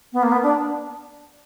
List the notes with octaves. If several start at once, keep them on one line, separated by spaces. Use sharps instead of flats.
B3
A#3
B3
D4